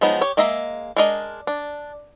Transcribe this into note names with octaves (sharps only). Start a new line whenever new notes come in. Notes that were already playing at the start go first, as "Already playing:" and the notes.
F3 F#3 G#3 B3 D#4
G4 C#5
G#3 A#3 D#5 E5 A#5
G#3 D4 A#4 D#5
D4